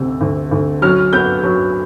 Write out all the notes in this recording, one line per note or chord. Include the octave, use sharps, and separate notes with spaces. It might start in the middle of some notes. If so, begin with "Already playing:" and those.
Already playing: D2 C3 E6
D2
D2
F#3 F6
B3 G6
F#3